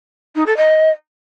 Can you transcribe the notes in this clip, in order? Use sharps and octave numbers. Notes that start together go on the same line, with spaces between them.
D#4
A4
D#5